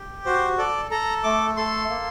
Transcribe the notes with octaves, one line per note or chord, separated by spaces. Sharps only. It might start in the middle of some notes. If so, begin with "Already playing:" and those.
Already playing: G4
F#4 C5
A4 D5
A4 A#5
A3 D6
A4 C6
A#3